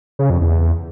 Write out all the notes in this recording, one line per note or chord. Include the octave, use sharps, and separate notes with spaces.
C#3
F2
E2